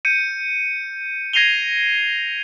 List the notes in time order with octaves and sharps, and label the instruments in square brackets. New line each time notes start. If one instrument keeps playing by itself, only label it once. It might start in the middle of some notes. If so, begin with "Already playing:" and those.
[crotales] G6 C#7 D#7
G#6 A#6 C7 D#7 F7 G7